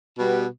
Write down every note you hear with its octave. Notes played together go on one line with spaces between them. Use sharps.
B2 G3 B3